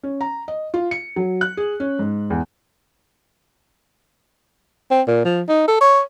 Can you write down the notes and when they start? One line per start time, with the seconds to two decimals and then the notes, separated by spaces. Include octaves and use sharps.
0.03 C#4
0.21 A#5
0.48 D#5
0.74 F4
0.91 C#7
1.16 F#3
1.41 F#6
1.57 G#4
1.80 C#4
1.99 G#2
2.30 E2
4.91 C4
5.07 A#2
5.25 F3
5.48 D#4
5.68 A4
5.81 C#5